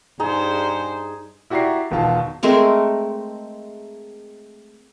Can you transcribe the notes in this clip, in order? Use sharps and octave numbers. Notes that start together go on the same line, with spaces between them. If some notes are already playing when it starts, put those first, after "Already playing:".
G2 D#4 G#4 C5 A#5
E4 F#4 G4 D5 A#5 C7
E1 B2 D#3 F4 A5
G#3 A3 C4 A#4